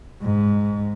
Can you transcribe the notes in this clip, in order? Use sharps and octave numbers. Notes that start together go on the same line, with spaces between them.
G#2